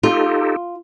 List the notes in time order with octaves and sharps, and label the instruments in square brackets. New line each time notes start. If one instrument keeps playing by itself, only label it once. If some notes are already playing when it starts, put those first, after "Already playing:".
[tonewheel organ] D#4 G4 A4 [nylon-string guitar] F4